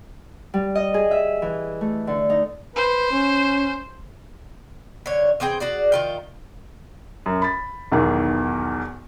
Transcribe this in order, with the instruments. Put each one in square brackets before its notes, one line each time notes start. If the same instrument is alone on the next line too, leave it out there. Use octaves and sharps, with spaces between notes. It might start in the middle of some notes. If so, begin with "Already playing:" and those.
[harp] G3
D#5
G#4
E5
E3
A3
D3
D#4
[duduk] B4 [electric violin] C5
[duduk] C#4
[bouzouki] D3 C#5
E3 C4 G#4 G5
F#4 G#4 D5
D#3 F4 G5
[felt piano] F#2
B5 A6
B1 E2 B2 D#3